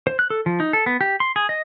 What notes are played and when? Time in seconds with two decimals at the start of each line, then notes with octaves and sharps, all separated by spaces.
0.07 C5
0.19 F#6
0.30 A4
0.46 F3
0.60 D#4
0.73 A4
0.86 B3
1.01 G4
1.20 C6
1.36 G#4
1.49 D#5